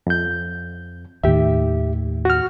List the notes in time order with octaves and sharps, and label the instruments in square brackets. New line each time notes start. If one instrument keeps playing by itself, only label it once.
[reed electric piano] F2 G6
[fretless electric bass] D#2 A2 D#3 [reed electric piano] G4 E5
[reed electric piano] F#4 F6